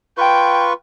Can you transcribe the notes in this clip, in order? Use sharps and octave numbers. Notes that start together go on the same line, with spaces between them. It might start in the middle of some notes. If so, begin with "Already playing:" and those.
F4 B4 G5 C#6